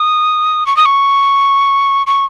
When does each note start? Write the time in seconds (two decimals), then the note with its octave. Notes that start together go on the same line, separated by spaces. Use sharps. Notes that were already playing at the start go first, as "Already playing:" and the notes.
Already playing: D#6
0.66 C#6
0.77 D#6
0.85 C#6
2.07 C#6